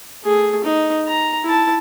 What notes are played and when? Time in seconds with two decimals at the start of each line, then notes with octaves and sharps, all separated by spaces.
0.23 A3 G#4
0.64 D#4
1.07 A#5
1.44 E4 A5